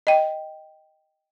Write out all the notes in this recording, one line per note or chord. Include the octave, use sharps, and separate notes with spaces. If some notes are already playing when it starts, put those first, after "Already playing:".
D#5 G5